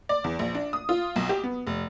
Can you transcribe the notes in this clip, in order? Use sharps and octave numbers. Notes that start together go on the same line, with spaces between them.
D5
E2
A#1
D4
D#6
F4
B1
G4
B3
F1